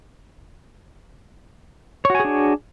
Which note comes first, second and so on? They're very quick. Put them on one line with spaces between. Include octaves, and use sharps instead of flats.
C#5 F#4 G#5 G#4 D4